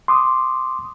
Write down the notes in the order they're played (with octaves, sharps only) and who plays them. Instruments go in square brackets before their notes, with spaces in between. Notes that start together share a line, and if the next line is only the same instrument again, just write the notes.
[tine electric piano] C6 D6 D#6